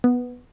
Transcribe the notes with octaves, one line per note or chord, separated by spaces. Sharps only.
B3